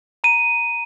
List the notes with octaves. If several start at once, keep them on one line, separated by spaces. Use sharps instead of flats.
A#5 D#7